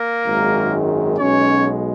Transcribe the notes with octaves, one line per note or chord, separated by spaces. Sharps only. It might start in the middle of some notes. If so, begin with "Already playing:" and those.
Already playing: A#3 A#4
G#1 F#2 D#3 G#3
B1 B2 G#3 C#4 C#5